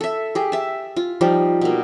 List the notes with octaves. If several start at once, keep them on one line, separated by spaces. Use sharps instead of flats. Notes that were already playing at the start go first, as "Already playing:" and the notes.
A4 E5
G4 G#4
E5 A5
F4
F3 G3 D#4
B2 A#3